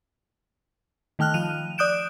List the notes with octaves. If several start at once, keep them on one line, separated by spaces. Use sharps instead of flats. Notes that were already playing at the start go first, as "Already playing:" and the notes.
D#3 A3 G5 F6 F#6
F3 D#7 F7
D5 D#6 F#6 G6 D7 E7